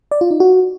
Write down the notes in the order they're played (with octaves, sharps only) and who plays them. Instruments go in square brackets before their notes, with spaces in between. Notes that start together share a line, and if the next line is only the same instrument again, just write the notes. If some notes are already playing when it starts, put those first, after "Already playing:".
[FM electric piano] D5
F4
D#4
F#4